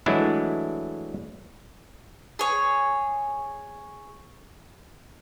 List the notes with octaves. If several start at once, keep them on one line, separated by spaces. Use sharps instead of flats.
E3 F#3 G#3 A3 D4 E4
G#4 C#5